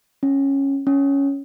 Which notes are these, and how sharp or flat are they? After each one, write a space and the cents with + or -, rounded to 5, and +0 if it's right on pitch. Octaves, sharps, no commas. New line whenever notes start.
C#4 -10
C#4 +5